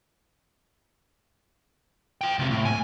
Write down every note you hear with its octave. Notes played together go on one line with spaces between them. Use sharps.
F4 G5
C#2 C3
A2
G#5